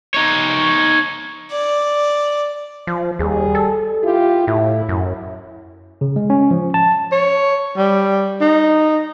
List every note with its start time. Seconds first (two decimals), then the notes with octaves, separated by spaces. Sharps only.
0.14 D#4 C#5
1.51 D5
2.87 F3
3.19 D#2 G3 G#4
3.55 A4
4.02 E4 F4 G4
4.47 A2 E4
4.89 F#2
6.01 C#3
6.16 G#3
6.30 C#4
6.51 F3
6.74 A5
7.12 C#5
7.77 G3
8.41 D#4